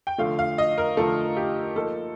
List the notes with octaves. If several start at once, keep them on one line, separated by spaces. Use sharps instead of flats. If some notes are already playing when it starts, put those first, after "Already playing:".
G5
D3 F3 A3 F5
F5
D#5
A#4
D3 F3 A3 A4
G4
F3 A#3 D#4 A4